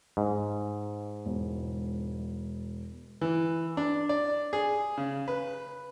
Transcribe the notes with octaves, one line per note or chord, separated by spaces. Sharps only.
G#2
E1
E3
D4
D5
G#4
C#3
B4